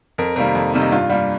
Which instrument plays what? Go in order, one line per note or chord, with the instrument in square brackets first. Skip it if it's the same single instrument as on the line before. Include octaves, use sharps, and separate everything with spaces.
[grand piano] F2 A#4
C3 D#3 G3 A#3 A#4
F2
C3 D#3 G3 A#3
D#4
G2 F4
G3 A#3 F4